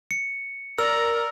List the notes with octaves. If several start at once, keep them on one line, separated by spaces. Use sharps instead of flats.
C#7
A#4 D5 A#5 E6